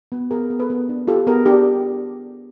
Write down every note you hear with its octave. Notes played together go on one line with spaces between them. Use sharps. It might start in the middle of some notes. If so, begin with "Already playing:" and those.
B3
B3 G#4 A#4
B3
A4 B4
B3
D4
F4 G4 A4
B3 G#4 A#4
D4 G4